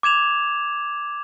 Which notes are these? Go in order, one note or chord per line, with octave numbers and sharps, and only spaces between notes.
D6 G#6 E7 F7